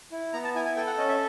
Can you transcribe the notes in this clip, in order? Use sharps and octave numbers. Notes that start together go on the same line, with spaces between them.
E4
B3 A#5
A5
E4 G#5
G#5
A4 G5
F#5
C#4 D#5
E5